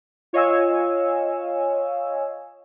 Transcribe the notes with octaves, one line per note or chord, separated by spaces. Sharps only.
F4 C#5 D#5 F5 G#5 E6